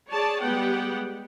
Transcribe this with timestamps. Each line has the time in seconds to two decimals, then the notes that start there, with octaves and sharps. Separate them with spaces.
0.11 G#4 C#5 D5 A5
0.41 G3 G#3 B3 G4 F#5 G5